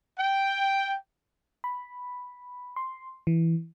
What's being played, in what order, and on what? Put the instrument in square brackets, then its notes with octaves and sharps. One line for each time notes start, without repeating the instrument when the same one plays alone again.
[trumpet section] G5
[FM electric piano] B5
C6
E3